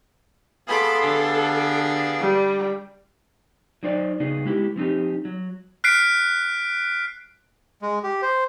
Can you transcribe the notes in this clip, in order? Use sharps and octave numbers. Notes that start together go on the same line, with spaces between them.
B3 G#4 A4 F5 B5 C6 D6
D3 D4 G4
G3
F#3 D#4 C5 D5
C#3 B3 D#4 F#4 G#4
G#3 B3 E4 G4
F3 C4 D#4 G4
F#3
F6 F#6 B6 C7 D7
G#3
G4
C5